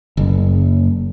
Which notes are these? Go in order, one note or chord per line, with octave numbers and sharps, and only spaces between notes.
F#1